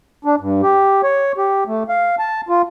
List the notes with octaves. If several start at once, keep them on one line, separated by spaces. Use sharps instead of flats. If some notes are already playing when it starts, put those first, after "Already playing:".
D4
G2
G4
C#5
G4
A3
F5
A5
F4